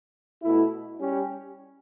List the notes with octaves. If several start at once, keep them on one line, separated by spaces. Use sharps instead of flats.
B2 A3 E4
G3 C#4 G4